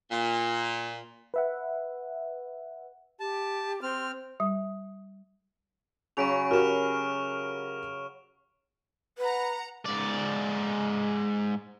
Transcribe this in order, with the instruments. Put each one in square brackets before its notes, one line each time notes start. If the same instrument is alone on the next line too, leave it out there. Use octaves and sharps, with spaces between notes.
[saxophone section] A#2
[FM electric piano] B4 E5 F#5
[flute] G4 [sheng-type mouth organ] A5
[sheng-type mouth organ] C4 F6 [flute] C6
[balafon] G3
[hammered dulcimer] C#3 F#3 B5 [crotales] C#6 D7 F7
[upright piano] F#4 G4 A#4 [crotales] F6 E7
[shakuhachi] B4 [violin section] F#5 A#5
[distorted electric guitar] G#2 D5